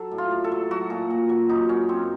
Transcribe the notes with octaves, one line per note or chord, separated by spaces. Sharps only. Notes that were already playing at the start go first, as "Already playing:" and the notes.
Already playing: F#3 A4
A2
F4
A2
A4
F#3
F#3 F#4
A#2
A#2
F#3
F#2 D#4
F#3 C#4
F#2 C4